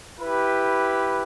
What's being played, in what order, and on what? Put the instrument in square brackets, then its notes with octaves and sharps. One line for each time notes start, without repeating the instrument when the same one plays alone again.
[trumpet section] E4 G4 B4